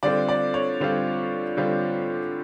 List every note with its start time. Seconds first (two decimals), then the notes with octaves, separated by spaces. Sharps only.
0.03 D3 G3 C4 F4 D5
0.28 D5
0.54 C#5
0.80 D3 G3 C4 F4
1.57 D3 G3 C4 F4